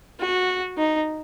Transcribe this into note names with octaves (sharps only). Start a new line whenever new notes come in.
F#4
D#4